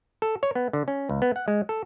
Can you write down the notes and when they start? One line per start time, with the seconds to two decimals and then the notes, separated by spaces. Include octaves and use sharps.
0.22 A4
0.43 C#5
0.55 B3
0.73 D3
0.88 C#4
1.09 C#2
1.22 B3
1.36 F#5
1.48 G#3
1.69 A4